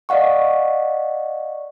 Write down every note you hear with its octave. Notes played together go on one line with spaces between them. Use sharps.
D5 D#5 F5 F#5 C#6